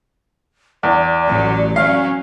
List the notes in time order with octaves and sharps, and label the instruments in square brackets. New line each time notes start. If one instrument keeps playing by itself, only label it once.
[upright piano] E2 [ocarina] D5
[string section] A1 F#3
[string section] F#3 C#4 [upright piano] F5